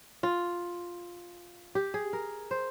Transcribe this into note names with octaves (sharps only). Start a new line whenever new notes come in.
F4
G4
G#4
A#4
C5